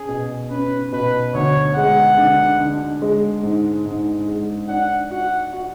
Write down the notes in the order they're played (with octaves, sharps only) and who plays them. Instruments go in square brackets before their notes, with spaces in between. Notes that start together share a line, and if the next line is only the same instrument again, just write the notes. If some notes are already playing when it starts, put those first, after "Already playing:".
Already playing: [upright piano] C#4 [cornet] G#4
[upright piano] B2
[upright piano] C#4 [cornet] B4
[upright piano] B2 [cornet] B4
[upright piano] D2 [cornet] C#5
[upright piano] G#3 [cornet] F#5
[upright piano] D3
D3
G#3
G#2
G#2
G#3
[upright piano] D4 [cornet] F#5
[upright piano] F#4 [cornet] F#5
[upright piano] F#4